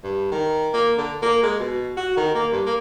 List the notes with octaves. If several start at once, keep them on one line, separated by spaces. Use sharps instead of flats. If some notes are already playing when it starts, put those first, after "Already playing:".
G2
D#3
A#3
D3
A#3
G#3
B2
F#4
D#3
A#3
G2
A#3